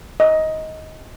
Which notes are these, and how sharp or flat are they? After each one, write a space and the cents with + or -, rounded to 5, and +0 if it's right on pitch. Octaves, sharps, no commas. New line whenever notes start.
D#5 +15